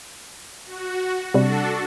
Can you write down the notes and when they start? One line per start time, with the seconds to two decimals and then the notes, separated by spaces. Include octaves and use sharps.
0.65 F#4
1.34 C3 G3 D4 F#4 A4